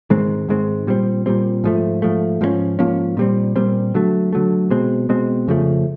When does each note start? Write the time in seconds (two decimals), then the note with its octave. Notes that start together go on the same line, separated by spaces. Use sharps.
0.10 G#2 D#3 G#3 C4
0.49 G#2 D#3 G#3 C4
0.87 A#2 G3 C4
1.26 A#2 G3 C4
1.64 G#2 F3 A3
2.02 G#2 F3 A3
2.41 G#2 F3 A#3 C#4
2.79 G#2 F3 A#3 C#4
3.17 A#2 G3 C4
3.56 A#2 G3 C4
3.94 D3 F#3 A3
4.33 D3 F#3 A3
4.71 B2 G#3 C4
5.09 B2 G#3 C4
5.47 F2 C#3 F3 A3